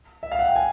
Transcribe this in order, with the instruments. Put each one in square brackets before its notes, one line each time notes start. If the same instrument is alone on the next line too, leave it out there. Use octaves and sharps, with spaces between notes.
[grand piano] E5
F5
F#5
G5
G#5